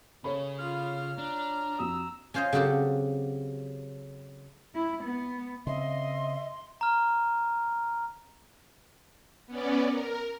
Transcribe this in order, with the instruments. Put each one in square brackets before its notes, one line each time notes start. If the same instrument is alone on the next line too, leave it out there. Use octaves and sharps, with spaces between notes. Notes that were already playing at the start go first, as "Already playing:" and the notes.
[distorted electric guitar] C#3 [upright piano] A4 C#5 B5
[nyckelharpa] F4 [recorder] F6
[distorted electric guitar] D4 [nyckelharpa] A#5
[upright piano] F2 F#4 D#6 [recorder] E6
[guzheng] C#4 F4 C5 C#5 D#5
C#3 F#3 C4 F#4 G4 A4
[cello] E4
B3
[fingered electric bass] C#3 C4 [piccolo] D#5 [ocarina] E5 [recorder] C6
[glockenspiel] A#5 F6
[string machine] B3 C#4 D5
A#4